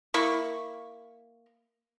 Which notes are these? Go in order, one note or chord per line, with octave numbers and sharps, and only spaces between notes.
A#3 E4 C#6